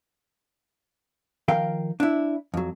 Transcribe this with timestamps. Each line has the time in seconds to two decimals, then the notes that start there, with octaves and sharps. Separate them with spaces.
1.48 D#3 F3 A#4 F5 G5
2.00 D4 E4
2.54 F2 F#3